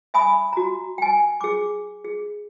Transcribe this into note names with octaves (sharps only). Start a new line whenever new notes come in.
E5 G#5 B5 D#6
F#4 A#5
G5 G#5
G#4 D6
G#4